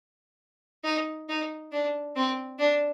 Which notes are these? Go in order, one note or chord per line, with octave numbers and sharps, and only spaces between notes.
D#4
D#4
D4
C4
D4